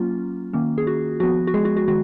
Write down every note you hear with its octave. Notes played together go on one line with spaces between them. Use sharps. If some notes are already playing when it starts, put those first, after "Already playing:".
Already playing: F#3 A#3 C#4 F4
D#3 A#3 C#4
G#4
F#4
F3 B3 F#4
F#4
G#3 G#4
F#4
F#4
D#3 G#3 F#4